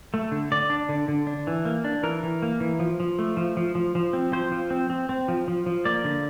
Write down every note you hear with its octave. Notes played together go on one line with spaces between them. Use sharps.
A3
D3
D3 D5
D4
D3
D3
D4
E3
A#3
D4
E3 A#4
E3
A#3
E3
F3
F3
A3
F3
F3
F3
F3
C4
F3 C5
F3
C4
C4
C4
F3
F3
F3
A#3 D5
D3